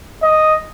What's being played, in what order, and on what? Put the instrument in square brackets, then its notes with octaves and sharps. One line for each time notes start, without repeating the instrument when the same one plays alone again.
[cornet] D#5